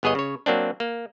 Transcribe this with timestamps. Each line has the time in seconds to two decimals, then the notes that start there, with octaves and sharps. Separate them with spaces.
0.03 G1 B3 G#4 C#5 D#5
0.15 C#3 C#5
0.46 F#3 A#3 C4 D4
0.80 A#3